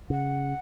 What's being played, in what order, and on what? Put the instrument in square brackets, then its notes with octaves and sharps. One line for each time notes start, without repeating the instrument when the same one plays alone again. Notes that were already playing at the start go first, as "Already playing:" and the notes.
[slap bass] C#3 [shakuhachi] F#5